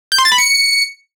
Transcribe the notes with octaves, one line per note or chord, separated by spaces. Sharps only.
G6
C6
A6
B5
C#7